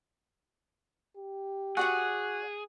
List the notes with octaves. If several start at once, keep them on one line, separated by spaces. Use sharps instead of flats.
G4
F#4 G#4 D5 F#5 F#6